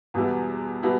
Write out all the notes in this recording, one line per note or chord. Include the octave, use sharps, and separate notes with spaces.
E2 B2 G3 B3 E4
B2 G3 B3 E4